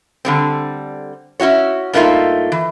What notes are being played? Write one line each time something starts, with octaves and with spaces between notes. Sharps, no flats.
D3 G3 C4
C#4 E4 F#4 C#5
G2 A3 A#3 D#4 F4 E5
E3